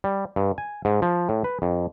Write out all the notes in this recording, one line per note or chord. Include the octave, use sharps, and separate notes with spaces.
G3
G2
G#5
G#2
F3
A2
B4
F2